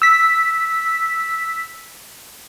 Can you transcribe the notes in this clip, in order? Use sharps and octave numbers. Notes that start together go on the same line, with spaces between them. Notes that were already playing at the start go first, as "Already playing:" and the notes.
E6 B6